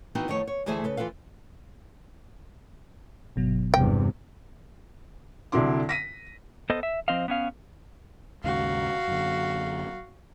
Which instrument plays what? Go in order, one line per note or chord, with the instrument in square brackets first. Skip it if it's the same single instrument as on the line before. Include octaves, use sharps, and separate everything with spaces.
[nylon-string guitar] E3 B3 C4 D#4 F#4
F2 D#3 A3 E4 C#5
C#5
D2 E3 A3 G#4 C5 E5
C#3 A4 B4
E3 F4 A4 B4 F5
[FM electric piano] G1 B2 F#3
[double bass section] E2 G2 C3 [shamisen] G5
[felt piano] C2 D3 F#3 E4 C6 D6
A#6 B6 D#7
[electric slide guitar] B3 A4 C5 D#5
E5
F3 C4 C5 D#5 F5
B3 C#4 F5
[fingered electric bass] D#2 G#2 C#3 [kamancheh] F#4 F5
[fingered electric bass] F#2 D3